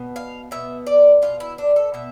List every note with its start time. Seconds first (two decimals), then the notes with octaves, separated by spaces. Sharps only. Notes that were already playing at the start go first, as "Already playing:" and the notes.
Already playing: B2 B3
0.16 F5
0.51 B2 B3 E5
0.87 D5
1.22 B2 B3 F4
1.40 E4
1.58 D4
1.76 A4
1.94 B2 B3 E5